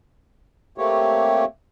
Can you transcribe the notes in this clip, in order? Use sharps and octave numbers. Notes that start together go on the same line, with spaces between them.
A3 A#3 C4 G4 C#5